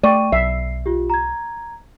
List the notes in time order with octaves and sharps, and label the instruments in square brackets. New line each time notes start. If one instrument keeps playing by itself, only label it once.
[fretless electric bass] A3 [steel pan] D5 [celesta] G5 C#6 D#7
[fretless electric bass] B1 [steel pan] E5 [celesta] C7
[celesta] F4 G4
A#5 G#6